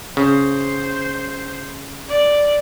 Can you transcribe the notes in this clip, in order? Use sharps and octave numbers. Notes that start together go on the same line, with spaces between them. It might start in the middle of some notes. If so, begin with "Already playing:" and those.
C#3 C5
D5